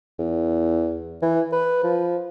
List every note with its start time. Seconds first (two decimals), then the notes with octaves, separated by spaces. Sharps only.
0.19 E2
1.22 E3
1.53 B4
1.84 F3